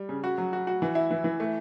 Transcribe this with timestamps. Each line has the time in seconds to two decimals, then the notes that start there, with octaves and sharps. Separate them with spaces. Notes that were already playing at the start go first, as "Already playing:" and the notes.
Already playing: G3
0.09 C#3
0.24 F#4
0.38 F#3
0.53 F#4
0.67 F#4
0.82 E3
0.95 E4
1.11 E3
1.24 E3
1.40 A3